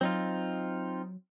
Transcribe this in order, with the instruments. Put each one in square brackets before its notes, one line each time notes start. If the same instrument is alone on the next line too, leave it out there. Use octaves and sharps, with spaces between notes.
[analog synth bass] F#3 [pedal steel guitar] C4 D#4 F4